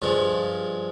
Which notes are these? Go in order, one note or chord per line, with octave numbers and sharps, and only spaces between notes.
G2 F3 G#3